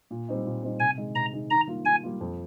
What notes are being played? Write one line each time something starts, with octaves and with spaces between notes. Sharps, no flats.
A#2
G3 C4 D#4
A#2
G3 C4 D#4
C3 G#5
D#3 G#3 D#4
C3 A#5
D#3 G#3 D#4
D#3 A#5
G3 A#3 F4
D#3 G#5
G3 A#3 F4
F2